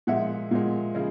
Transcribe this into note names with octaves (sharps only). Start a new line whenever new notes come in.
A#2 F3 G#3 E5 F#5
A#2 F3 G#3
C#3 F3 G#3